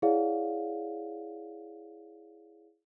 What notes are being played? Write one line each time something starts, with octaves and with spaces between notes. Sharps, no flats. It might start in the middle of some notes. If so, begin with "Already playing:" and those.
E4 G#4 C#5 D5 F5 F#5